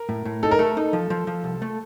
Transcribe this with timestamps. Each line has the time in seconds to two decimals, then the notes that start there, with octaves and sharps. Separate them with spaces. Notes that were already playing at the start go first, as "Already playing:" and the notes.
Already playing: A#4
0.09 A2
0.25 A2
0.43 D#4 A4
0.51 A#4
0.59 A3 A4
0.77 D#4
0.93 F3
1.10 F3
1.27 F3
1.44 C2
1.62 A3